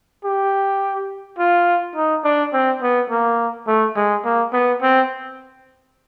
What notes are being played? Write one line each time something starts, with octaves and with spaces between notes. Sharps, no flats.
G4
F4
D#4
D4
C4
B3
A#3
A3
G#3
A#3
B3
C4